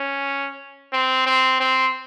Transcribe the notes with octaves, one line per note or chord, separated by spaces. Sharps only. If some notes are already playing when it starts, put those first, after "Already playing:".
Already playing: C#4
C4
C4
C4